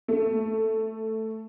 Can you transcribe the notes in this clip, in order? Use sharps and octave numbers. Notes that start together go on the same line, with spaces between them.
A3